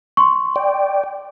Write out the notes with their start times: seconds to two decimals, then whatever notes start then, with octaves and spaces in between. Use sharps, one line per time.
0.17 C6 C#6
0.56 D5 G5